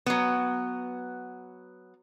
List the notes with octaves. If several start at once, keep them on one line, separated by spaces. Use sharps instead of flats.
F#3 B3